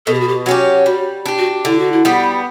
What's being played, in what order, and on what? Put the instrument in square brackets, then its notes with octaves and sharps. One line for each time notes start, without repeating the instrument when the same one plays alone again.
[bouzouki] B2 [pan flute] A4
[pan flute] G4
F#4
G4
[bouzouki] F#3 C#4 G4 [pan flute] F#4
[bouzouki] G3 [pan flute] F#4
[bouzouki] D4 G4
[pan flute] F#4
[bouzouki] D3 [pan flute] E4
[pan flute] F#4
E4
[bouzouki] G3 B3